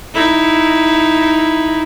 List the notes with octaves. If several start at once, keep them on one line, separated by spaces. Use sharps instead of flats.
D#4 E4